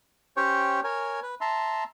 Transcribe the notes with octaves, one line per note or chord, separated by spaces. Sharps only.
C#4 G4 C5 C#5 G5 C#6
A#4 C#5 G#5
B4
E5 A5 A#5 C6